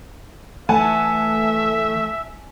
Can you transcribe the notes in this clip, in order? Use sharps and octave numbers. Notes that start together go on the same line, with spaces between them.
E3 A3 E5 F#5 G#5 A5